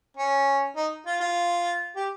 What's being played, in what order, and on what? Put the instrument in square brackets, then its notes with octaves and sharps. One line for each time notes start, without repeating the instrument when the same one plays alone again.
[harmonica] C#4
D#4
F4
F4
G4